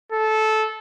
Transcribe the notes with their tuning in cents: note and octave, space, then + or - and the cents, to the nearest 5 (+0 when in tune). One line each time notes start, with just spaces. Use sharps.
A4 -15